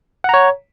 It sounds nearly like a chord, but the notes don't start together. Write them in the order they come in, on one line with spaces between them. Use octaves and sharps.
F#5 A#5 C#5